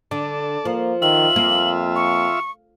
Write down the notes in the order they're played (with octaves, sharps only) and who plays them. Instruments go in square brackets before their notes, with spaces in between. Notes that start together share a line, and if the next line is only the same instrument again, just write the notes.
[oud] D3 [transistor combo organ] D5 A5
[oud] F3 [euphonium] A#3
[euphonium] D#3 [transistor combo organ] F4 E5 [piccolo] F#7
[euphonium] F2 [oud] A#3
[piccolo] C#6